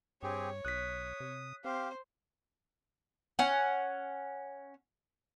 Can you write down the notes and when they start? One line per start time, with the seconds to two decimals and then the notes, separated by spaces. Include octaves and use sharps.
0.23 G2 C4 G4 G#4 C#5
0.65 B1 D#6 F#6 B6
1.20 C3
1.64 C4 G4 C5 F5
3.39 C#4 F#5